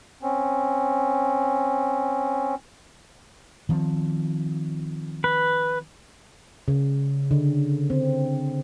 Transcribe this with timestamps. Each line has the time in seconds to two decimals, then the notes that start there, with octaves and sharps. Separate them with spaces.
0.22 C4 C#4
3.69 D#3 F3 C4
5.24 B4
6.68 C#3
7.31 D3
7.90 C4